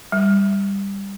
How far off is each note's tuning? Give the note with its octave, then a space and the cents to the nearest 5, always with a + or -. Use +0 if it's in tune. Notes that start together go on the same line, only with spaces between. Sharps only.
G3 +15